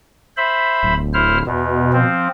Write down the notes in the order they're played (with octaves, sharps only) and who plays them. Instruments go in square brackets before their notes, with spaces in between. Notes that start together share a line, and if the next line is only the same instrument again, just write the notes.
[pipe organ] C5 E5 B5
[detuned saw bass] D1
[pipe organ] E4 C5 F6
[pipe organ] E2 [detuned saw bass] B2
[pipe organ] F3 C4